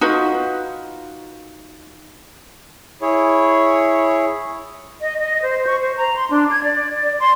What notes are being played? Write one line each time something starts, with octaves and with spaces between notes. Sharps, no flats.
D#4 F4 F#4 B4
E4 G#4 C#5
D#5
D#5
C5
C#6
C5
A#5
C6
D4
G#6
D5
D5
C6